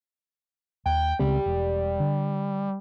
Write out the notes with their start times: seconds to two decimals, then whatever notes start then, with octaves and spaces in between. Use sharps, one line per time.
0.86 D#2 G5
1.19 C#2 C#3 G3 C4
1.46 E1
2.00 D3